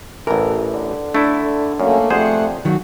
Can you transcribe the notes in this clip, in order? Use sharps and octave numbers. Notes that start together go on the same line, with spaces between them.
A1 E3 A4 A#4
D3
A3 D4 E4
F#2 A3 A#3 C#4
F2 G3 A3 G#4 C5 F#5
D#3 F#3 F#4